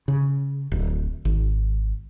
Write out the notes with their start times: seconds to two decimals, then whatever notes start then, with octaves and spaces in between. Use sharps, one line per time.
0.08 C#3
0.72 D1
1.25 G#1